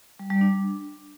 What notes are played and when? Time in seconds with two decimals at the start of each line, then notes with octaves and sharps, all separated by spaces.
0.19 G3
0.30 G3
0.41 D4